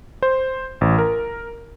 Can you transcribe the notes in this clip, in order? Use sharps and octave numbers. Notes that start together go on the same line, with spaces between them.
C5
A1
A#4